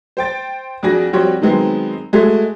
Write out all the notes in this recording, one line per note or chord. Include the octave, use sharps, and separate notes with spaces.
C5 G5 A6
F2 D4 F#4 G#4 A#6
F3 G3 C4 F#4 C#5
D#3 F#3 G#3 B3 C4
G#3 A3 F#4 G#4